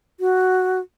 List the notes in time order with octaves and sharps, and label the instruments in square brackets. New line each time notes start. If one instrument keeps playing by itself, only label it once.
[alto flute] F#4